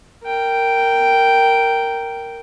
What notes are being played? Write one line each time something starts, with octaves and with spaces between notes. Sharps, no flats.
A#4 G5